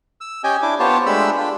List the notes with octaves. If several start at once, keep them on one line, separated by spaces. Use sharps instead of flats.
E6
C#4 G4 D#5 G5 G#5
D4 E4 D6
B3 F4 G4 C5 C#5 A5
G#3 A3 D4 G4 B5 E6
D4 F4 G4